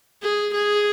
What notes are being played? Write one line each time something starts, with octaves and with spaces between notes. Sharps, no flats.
G#4
G#4